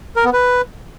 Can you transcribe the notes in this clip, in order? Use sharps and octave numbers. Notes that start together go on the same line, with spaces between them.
A#4
B3
B4